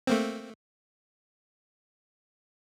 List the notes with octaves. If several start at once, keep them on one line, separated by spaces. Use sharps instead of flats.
A3 A#3 C4